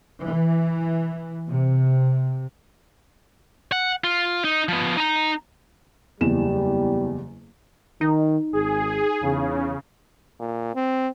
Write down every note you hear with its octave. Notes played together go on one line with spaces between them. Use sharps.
E3
C3
F#5
F4
D#4
F3 B3
D#4 A#5
F#1 E2 G3 E7
D#3 D#4
G#1 G#4
E2 C#3
A#2
C4